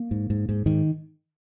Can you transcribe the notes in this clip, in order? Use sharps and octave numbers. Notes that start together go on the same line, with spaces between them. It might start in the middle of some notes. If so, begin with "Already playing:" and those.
Already playing: A#3
G#2
G#2
G#2
G#2 D#3